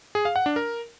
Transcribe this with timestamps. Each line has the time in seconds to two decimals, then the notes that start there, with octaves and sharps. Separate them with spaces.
0.15 G#4
0.25 F5
0.36 F#5
0.46 D4
0.56 A#4